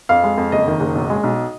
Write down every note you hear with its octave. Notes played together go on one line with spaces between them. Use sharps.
F2 F5
G#3
F2
F#1 D#5
D#3
F#1
B1
G#3
B1